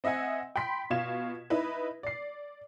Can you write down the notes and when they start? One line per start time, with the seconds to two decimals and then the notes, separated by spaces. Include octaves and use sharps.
0.04 C4 D#5 E5 F#5 G#5
0.56 G5 B5 C6 B6
0.90 B2 F4 F5 G#6 E7
1.50 D#4 E4 B4
2.03 D5 C7